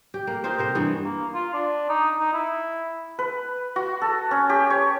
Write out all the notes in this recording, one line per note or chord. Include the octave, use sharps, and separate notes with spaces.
G4
A#3
D#4 F4 G4 C5
C3 A#4 C5
G2 E3 B3
A#3
F4
D4
D#4
D#4
E4
B4
F#4
A4
C#4
G4
C#5